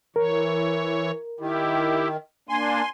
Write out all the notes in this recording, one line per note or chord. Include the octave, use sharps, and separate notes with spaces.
E3 A#4 C#5
D#3 E4 G4
A#3 D4 G#5 C6